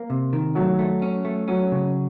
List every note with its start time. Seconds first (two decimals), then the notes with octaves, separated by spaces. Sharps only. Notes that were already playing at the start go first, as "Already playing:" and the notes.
Already playing: A#3
0.10 C3
0.33 D#3
0.55 F#3 A3
0.79 A3
1.02 C#4
1.25 A3
1.48 F#3 C#4
1.72 C#3